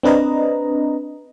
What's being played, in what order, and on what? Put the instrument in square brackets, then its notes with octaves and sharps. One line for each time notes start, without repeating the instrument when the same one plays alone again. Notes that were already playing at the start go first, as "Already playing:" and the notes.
[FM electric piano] C4 D4 B4 D#5 A#5